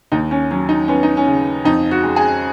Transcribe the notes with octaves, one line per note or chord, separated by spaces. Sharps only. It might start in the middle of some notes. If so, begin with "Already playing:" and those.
D#2 D#4
C#4
F#3 C#4
D#4
B3 C#4
D#4
C#4
C#3
F2 D#4
F#4
G#3
G#4